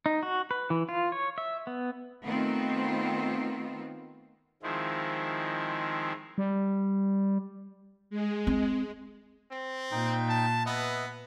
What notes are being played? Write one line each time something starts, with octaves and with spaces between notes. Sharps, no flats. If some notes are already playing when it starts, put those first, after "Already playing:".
D#4
F#4
B4
E3
F4
C#5
E5
B3
D#3 A3 B3 C4 F4
D#3 F3 G#3 C4 E4
G3
G#3
C4
C4
A#2 D#4 G5
A5
B3 B4 D#5 E5